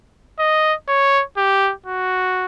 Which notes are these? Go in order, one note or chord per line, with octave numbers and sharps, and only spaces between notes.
D#5
C#5
G4
F#4